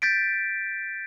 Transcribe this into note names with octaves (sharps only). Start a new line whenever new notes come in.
G6 A6 B6 D7